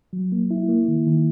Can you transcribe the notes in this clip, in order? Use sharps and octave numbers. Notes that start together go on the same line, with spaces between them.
F#3
A#3
E4
A#3
D#3
D#3